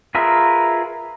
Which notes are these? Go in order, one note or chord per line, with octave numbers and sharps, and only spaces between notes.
F4 G#4 A#4 B4 E5